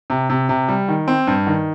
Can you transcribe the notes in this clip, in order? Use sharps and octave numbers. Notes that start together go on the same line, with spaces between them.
C3
C3
C3
G3
D#3
C4
G2
D#3